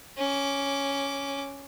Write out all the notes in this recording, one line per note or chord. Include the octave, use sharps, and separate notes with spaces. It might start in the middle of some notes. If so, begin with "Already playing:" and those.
C#4 D6